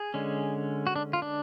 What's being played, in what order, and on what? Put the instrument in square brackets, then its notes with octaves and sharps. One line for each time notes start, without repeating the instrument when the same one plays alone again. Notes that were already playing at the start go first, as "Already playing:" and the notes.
Already playing: [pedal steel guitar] G#4
D3 G#3 C#4
F#4
D4
F4
D4